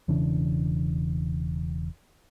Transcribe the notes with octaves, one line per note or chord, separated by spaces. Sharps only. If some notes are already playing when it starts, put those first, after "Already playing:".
E1 C#3 E3 D4